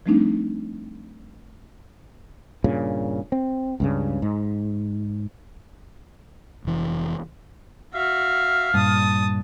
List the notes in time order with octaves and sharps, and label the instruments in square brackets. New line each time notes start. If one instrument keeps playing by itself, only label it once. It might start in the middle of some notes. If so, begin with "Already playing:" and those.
[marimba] F3 G3 A3 C4 D4 D#4
[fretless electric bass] G2 A#2 C#3
C4
C#2 G2 C#3
G#2
[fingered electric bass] F1 E3
[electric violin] F#4 E5 [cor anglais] F5
[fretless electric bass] G2 A#2 [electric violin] A5 D#6